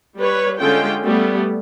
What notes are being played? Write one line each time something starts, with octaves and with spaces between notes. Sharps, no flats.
G3 B4 C#5
D3 G#3 C#4 F4 A4 G5
G3 A3 B3